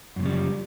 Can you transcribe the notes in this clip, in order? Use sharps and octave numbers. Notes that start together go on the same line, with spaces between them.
F#2 A2 C#3 F3 G3